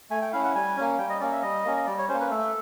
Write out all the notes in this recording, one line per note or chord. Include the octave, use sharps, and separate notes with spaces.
A3 G#5
G5
C#4 E4 F5
F#5
G3 G#5
A#3 C#4
G3 G5
D#5
A#3 C#4 D5
E5
G3 D#5
A#3 C#4
D#5
G3 D5
C#5
A#3 C#4 C5
B4
A3 A4